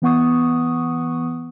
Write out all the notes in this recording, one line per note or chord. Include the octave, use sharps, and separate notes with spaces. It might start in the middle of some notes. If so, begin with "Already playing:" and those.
E3 B3 F#5 C#6 D#6